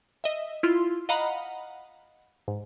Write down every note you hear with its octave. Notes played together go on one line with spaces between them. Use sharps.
D#5 E5
E4 F4 C6
D#5 F5 F#5 A#5 B5
G#2